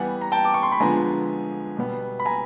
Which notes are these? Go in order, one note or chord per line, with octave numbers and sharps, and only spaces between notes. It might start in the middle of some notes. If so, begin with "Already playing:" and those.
Already playing: E3 G3 B3 F#5 G#5
A#5
G5 A5
D6
C#6
C6
B5
D3 F3 G#3 B3 G#5 A#5
B2 G3 B3
B5
G#5 A#5